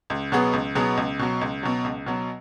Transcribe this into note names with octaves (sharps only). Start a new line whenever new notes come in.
C#2
B2 F#3 B3 G#4
C#2
B2 F#3 B3 G#4
C#2
B2 F#3
C#2
B2 F#3
C#2
B2 F#3